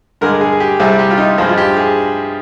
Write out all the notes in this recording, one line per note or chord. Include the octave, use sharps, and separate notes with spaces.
G2 D3 G#3 A#4
G#4
G4
C2 C3 G3 G#4
G4
F4
D#4
G2 F3 G#3 F4
F4
G4
G#4